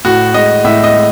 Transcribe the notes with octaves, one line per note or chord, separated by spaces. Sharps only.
A2 F#4
G#3 D#5
A2 E5
D#5
G#3